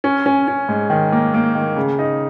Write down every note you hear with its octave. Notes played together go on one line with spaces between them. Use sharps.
C#4
C#4
C#4
G#2
D#3
A#3
A#3
D#3
C#3
D#4